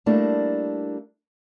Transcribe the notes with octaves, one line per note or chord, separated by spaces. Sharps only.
G3 A3 A#3 D4 E4 A#4